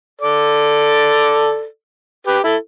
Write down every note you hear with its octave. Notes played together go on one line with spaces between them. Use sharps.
A4 D5
G4 B4
E4 A4